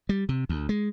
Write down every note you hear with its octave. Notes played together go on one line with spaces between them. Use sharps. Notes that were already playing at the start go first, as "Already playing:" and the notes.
G3
C3
D2
G#3